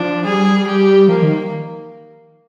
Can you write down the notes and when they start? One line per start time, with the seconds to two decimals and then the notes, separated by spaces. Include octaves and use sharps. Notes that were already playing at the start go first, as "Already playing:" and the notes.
Already playing: F3 D4
0.25 G3 G#4
0.67 G4
1.08 F3 A#3
1.22 D#3